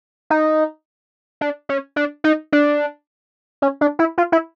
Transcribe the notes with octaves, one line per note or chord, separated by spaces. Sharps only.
D#4
D4
C#4
D4
D#4
D4
C#4
D4
E4
F4
E4